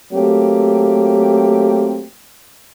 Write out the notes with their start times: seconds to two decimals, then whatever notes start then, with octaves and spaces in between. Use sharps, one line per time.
0.13 F#3 A3 A#3 C4 G4